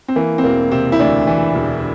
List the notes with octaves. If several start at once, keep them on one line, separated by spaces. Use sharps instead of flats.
C4
E3 A#3
C4
E1 A#3
C3 C4
E4
D2 D4
E3
E1